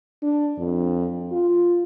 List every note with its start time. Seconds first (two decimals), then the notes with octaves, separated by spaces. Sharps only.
0.23 D4
0.58 F2
1.32 F4